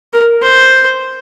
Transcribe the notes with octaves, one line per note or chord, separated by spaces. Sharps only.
A#4
C5